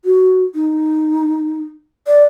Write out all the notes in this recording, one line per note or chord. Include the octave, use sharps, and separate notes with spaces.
F#4
D#4
D5